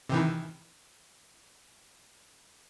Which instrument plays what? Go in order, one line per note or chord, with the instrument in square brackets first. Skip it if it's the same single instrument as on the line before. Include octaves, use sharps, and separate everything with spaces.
[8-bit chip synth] C3 D#3 E3